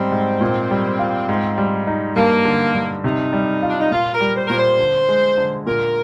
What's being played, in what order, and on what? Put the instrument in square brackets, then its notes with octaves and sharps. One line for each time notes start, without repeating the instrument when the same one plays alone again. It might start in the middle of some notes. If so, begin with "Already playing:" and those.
Already playing: [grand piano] G#2 G3 [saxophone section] C4
[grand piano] G#2
A#2
G3
F4
G#2
G3
D#4
[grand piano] G2 [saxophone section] A#3
[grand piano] D3
G2
[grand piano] C3 [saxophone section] D#4
[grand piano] G3
F4
[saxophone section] D4
D#4
[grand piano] A#2 [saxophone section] F4
[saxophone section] A#4
[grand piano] G3
[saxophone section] C5
[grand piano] A#2 [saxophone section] A#4
[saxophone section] C5
[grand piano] D3
G#3
D3
[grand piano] A#2 [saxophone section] A#4